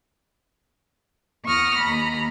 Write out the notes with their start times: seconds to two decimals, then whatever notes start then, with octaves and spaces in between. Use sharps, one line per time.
1.46 E2 C#6 D#6 F6 A#6
1.79 D#2 A#5 B5